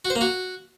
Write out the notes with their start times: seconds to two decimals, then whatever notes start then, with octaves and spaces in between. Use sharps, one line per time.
0.05 F#4
0.10 C5
0.15 A#3
0.21 F#4